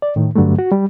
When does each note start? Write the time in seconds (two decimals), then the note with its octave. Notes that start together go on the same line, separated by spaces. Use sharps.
0.02 D5
0.16 A2 D#3
0.36 G2 D3 F#3 G3 A3
0.59 F#4
0.72 G3